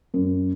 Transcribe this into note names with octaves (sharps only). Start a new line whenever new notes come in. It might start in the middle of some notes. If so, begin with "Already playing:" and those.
F#2